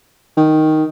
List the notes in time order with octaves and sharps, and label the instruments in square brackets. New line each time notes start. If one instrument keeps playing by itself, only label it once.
[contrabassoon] D#3